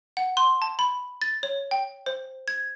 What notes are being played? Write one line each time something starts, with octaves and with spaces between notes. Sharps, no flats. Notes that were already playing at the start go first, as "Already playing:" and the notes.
F#5
C6
A5
B5
A6
C#5
G5
C5
G#6